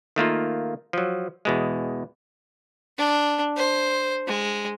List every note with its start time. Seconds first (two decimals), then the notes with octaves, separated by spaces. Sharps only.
0.16 D#3 A3 A#3 F4
0.93 F3 F#3
1.45 E2 B2 G#3
2.98 D4
3.57 C5
4.27 G#3